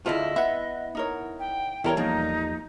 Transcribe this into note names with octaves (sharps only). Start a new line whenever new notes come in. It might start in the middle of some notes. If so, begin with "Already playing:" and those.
D2 E4 F4 G#4 A4 C5 D#5
B3 E4 E5 F#5
D#4 A#4 C#5
G5
E2 G3 E4 A4 A#4 C#5 G5
F3 A#3 D#4